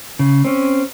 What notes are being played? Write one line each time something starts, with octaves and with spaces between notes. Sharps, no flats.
C#3
C4 C#4